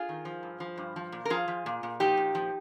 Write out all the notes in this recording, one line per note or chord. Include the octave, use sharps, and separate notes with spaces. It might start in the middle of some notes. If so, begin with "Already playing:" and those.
Already playing: F4 G#4
D#3
F3
G2
F3
G2
F3
A#2
A#4
F3 F4 G#4
F3
A#2
A#2
F3 D#4 G4
A#2
F3